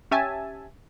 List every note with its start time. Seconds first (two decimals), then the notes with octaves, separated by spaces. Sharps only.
0.11 C#4 G4 E5 G#5 A5